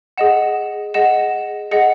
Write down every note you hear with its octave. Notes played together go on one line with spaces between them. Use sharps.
G#4 D#5 F#5 E7
G#4 D#5 F#5 E7
G#4 D#5 F#5 C#7